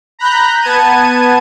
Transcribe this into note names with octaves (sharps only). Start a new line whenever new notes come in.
A#5 B5 F#6 G6 A#6
B3 A5 G#6 D#7